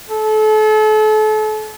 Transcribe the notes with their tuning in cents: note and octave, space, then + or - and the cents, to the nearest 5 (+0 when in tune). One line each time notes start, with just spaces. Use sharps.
A4 -35